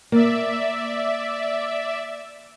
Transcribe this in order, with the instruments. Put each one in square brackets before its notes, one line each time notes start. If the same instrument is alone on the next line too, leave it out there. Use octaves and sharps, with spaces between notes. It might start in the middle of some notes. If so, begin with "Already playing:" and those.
[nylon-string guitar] A#3 [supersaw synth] D5 E5